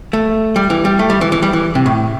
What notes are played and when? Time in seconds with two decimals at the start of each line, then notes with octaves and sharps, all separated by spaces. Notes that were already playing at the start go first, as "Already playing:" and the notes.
0.13 A3
0.56 G3
0.70 E3
0.85 G3
0.99 A3
1.10 G3
1.21 E3
1.32 E3
1.42 G3
1.53 E3
1.75 C3
1.86 A2